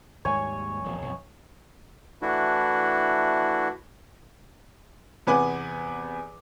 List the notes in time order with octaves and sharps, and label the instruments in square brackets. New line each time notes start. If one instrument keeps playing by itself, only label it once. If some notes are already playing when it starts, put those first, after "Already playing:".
[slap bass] D#2 G#2 G3 [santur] C#5 G#5
[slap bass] D#1 F2
B1 F2
[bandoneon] E3 A3 D4 E4 F#4
[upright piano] E2 C3 B3 B4 G#5 D6